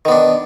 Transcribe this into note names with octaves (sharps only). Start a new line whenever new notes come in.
D#3 B3 D4